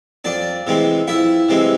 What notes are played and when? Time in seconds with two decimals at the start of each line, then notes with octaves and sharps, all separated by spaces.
0.25 F2 D4 D5
0.67 C3 E3 G#3 C4
1.08 F2 E4 E5
1.49 C3 E3 G#3 C4